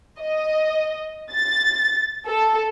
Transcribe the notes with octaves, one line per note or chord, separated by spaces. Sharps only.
D#5
A6
A4